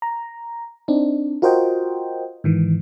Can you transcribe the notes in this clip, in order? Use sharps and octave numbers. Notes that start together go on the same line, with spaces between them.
A#5
C4 D4 D#4
F4 F#4 A#4 C5 D#5 G5
G#2 D#3 E3